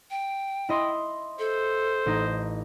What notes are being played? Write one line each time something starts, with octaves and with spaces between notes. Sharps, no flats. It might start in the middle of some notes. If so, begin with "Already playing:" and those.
G5
E4 D#5 C6
A4 C5
A1 D#4